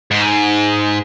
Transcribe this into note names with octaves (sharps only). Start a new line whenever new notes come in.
G#2